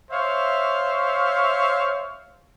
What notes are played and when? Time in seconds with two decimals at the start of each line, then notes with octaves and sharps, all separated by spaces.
0.10 C5 C#5 E5 F5